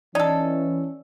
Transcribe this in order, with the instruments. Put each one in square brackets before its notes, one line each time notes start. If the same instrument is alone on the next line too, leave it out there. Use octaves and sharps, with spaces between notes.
[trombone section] E3 C#4 [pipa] D#4 A4 [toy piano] D5